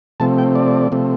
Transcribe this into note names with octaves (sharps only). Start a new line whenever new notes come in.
C3 F3 A3 C4 A5
G5
D5
C3 F3 A3 C4